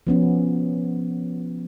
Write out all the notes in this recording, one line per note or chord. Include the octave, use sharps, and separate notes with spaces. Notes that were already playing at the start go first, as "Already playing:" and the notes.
F3 B3 C#4